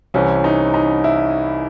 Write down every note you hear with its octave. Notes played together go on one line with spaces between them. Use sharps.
C2 C3 E3 C#4
D#4
D#4
E4